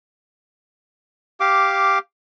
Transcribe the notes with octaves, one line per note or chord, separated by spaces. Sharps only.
G4 F5 D6